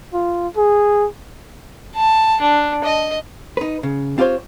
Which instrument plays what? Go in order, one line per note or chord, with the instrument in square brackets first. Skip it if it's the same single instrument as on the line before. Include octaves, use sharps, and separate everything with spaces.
[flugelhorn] F4
G#4
[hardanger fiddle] A5
D4
D#5
[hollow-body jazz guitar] D#4 B4
C#3
C4 F4 G4 A4 C5 C#5